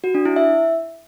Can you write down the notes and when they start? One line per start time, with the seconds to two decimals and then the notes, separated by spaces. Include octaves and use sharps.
0.04 F#4
0.15 D4
0.25 E4
0.36 E5